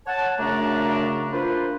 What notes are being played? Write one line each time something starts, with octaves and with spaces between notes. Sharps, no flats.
C#5 F#5 A5
F#2 C#3 A3 D4 F#4 A#5
A#3 D4 F4 B4 C5